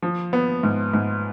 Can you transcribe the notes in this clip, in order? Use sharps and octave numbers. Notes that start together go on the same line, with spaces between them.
F3
B3
G#2
G#2